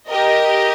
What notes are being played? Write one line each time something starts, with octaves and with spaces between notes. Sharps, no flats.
G4 A#4 D#5